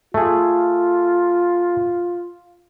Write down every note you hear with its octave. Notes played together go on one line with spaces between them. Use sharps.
A3 F4 G#4